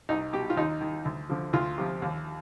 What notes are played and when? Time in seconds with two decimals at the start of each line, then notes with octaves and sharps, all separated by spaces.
0.09 C2 D#4
0.33 B2 G4
0.50 F4
0.57 D#2 D#4
0.81 D#3
1.05 D2
1.30 D3 F3
1.53 D2 F4
1.78 C3 F3
2.02 D#2